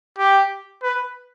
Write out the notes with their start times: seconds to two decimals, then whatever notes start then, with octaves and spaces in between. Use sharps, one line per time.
0.18 G4
0.83 B4